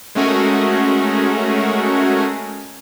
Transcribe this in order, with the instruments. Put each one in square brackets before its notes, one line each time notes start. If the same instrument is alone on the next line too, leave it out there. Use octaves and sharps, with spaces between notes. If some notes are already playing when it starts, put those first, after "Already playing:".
[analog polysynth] G#3 A3 C#4 F#4 G#4 A#4